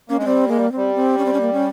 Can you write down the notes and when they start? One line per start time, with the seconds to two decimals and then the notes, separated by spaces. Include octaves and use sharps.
0.09 A#3 C#4
0.17 G#3
0.21 C#4
0.25 G3 C4
0.48 G#3 A#3
0.57 G3
0.72 C4
0.77 G3
0.95 C4
1.18 C#4
1.25 C4
1.33 C#4
1.41 A#3
1.53 C#4